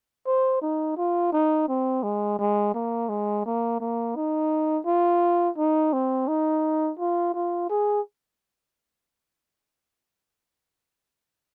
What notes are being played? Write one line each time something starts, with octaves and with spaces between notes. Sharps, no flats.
C5
D#4
F4
D#4
C4
G#3
G#3
A#3
G#3
A#3
A#3
D#4
F4
D#4
C4
D#4
F4
F4
G#4